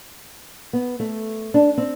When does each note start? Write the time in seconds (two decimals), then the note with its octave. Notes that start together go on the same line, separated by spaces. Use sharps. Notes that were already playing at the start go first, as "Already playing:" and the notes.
0.73 B3
1.00 A3
1.54 D4
1.78 C4